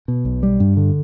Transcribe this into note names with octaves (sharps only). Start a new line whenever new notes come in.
B2
B1
G3
G2
D3